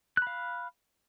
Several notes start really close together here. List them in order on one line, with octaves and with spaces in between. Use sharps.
F#6 B5 F5